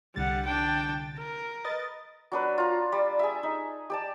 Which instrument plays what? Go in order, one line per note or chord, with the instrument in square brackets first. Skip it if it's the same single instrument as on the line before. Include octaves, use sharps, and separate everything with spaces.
[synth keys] C2 D3 A6 [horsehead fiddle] G3 F#5
[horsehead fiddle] D4 G5
A#4
[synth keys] B4 D#5 A6
[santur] F#3 D4 B4
F4 A#5
G3
G#4 E5
D#4
G4 D5 A5